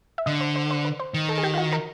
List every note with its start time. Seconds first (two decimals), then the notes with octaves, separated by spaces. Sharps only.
0.18 E5
0.26 D3 D#5
0.41 C5
0.56 C5
0.71 C5
0.85 B4
1.00 C5
1.14 D#3
1.29 A4
1.38 G#4
1.44 G4
1.54 F4
1.58 F#4
1.73 A#4